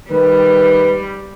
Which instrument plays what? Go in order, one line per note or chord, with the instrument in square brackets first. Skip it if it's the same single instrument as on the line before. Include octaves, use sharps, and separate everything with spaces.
[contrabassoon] D#3 [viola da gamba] G3 [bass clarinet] B4